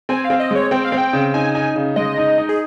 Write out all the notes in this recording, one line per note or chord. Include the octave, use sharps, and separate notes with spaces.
C4 G#5
F5
C4
D#5
G#3 C#5
C4 G5
F5
C4
G5
C#3
D#4 G#5
D#4 G#5
C#3
G#3 D#5
D#4
D#4
G#4